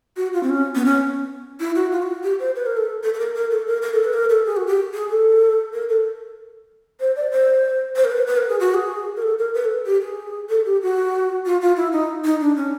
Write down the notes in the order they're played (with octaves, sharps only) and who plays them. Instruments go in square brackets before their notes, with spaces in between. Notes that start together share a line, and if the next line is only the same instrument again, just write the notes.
[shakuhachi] F#4
F4
C4
C#4
B3
C#4
E4
F#4
F4
F#4
G4
C5
B4
A#4
A4
A4
A4
A#4
A#4
A4
A#4
A#4
A4
B4
A#4
A4
G#4
F#4
G4
G#4
A4
A#4
A4
C5
D5
C5
C5
A#4
B4
B4
A#4
G#4
F#4
G#4
A#4
A4
A#4
B4
A4
G4
G#4
A4
G4
F#4
F4
F4
E4
D#4
D#4
D4
C#4